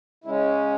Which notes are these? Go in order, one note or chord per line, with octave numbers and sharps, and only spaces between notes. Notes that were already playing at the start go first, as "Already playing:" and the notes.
C#3 G#3 C#4 E4